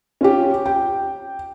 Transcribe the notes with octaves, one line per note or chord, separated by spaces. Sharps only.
C#4 F4 G4
G5